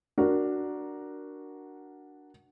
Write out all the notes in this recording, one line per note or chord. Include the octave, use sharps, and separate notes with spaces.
D4 F#4 A#4